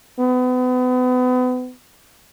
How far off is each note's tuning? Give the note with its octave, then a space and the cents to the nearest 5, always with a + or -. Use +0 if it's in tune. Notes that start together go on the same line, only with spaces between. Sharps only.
B3 +35